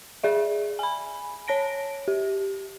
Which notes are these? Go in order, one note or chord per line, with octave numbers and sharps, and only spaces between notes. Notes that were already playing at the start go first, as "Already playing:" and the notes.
G#4 D5 E5
G#5 B5
C#5 A5 A#6 D7
G4